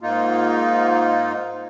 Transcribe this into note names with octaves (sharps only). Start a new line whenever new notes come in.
G#2 A#3 D#4 F4